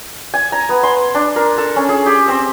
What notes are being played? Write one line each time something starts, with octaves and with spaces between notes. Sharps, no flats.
G#5
A#5
B3
C6
D4
A#4
A4
C#4
G#4
G4
C4